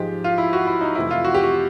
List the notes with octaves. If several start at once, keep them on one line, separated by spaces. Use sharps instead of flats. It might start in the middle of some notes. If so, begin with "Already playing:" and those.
Already playing: G#2 F3 G#3 G4
F4
E4
F#4
E4
D#4
F2 C3 E3 A3 E4
F4
F#4
G4
F#4